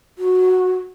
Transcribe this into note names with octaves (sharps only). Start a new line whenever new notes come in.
F#4